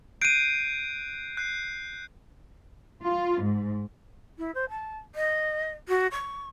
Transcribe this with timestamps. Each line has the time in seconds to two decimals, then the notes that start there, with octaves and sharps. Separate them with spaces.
0.22 F#6 G6 C7 D7 D#7
1.37 F#6 G6 C7
3.03 F4
3.43 G#2
4.38 E4
4.55 C5
4.70 A5
5.15 D#5
5.89 F#4
6.11 C#6